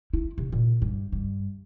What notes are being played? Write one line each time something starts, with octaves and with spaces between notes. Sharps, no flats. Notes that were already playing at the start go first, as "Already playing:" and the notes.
E4
C3
A#2
G2
G2